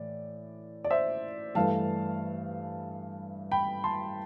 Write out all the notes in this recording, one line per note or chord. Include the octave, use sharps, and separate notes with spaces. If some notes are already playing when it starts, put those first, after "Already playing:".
Already playing: A2 E3 D5
D5
C5 E5
G2 E3 A3 F5 A5
G5 B5
A5 C6